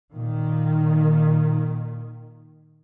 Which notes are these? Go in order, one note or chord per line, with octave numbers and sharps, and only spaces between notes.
A#2 D#3